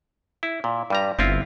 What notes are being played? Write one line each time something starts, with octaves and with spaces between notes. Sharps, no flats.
E4
A#2
G2 G3 A#5
G1 C4 E4 F4